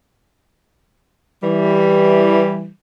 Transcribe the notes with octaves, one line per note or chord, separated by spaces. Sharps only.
E3 G3